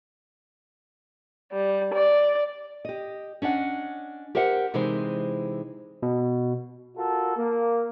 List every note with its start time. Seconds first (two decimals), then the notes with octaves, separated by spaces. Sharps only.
1.53 G3
1.93 D5
2.85 G4 D#5
3.42 C#4 D4 D#5 F#5
4.35 G4 A#4 C5 E5 F#5
4.74 C3 E3 G#3 D#4 C5
6.02 B2
6.97 F4 F#4 A4 A#4
7.37 A#3